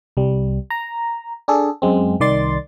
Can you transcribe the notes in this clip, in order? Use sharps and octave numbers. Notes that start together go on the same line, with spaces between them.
C2 G3
A#5
D4 G#4 A4
F#2 G#3 C4
C2 D#3 D5 C6 A6